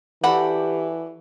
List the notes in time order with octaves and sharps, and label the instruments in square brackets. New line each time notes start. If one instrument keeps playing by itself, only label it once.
[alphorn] E3 [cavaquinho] F#4 D5 B5 [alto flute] G4 [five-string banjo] A4 F#5